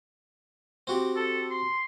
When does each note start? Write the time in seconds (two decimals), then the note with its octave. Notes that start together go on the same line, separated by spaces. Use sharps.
0.87 C4 F#4 G4
1.16 A4
1.51 C6